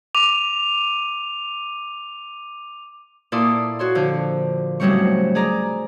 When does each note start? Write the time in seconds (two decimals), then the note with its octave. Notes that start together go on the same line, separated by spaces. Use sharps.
0.15 D6 D#7 F7
3.32 A#2 E4 A4 D5 C6 D#6
3.79 F#4 C#5 C6
3.95 D3 F3
4.80 A2 C#3 F#3 G3 C4 C#6
5.35 G#4 D5 A#5